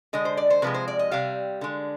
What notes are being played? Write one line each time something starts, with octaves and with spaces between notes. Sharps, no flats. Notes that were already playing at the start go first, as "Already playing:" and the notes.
D3 G#3 D#5
C5
D5
C5
C3 F3 G#3 B4
C5
D5
D#5
C3 G3 F5
D3 G#3